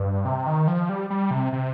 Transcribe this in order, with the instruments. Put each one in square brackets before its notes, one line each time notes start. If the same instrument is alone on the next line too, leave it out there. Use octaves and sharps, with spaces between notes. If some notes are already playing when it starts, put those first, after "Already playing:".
Already playing: [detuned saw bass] G2
C3
D#3
F3
G3
G3
C3
C3